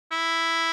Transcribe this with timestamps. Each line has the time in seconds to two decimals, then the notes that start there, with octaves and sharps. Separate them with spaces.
0.12 E4